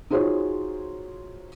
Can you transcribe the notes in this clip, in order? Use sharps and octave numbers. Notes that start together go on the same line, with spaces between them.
D#4 F4 F#4 G#4 C5 C#5